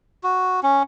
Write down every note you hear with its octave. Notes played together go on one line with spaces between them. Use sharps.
F#4
C#4